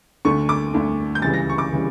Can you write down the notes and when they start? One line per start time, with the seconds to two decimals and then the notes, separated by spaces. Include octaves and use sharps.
0.25 D2 D3 A3 C#6
0.49 D6
0.74 D2 D3 A3
1.15 G6
1.22 C#2 C#3 E3 G3 A6
1.34 A#6
1.49 C#6
1.58 D6
1.72 C#3 E3 G3